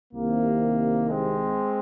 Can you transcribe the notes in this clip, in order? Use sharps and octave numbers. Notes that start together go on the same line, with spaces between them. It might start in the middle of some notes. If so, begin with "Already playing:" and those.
C2 C3 D#3 A#3
G#3 C4